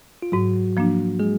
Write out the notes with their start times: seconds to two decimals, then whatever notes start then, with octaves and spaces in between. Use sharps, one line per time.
0.22 F4
0.32 G#2 F#3 F#4
0.77 F3 A#3 D4
1.19 G#3 G#4